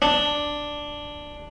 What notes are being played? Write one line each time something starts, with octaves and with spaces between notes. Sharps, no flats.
D4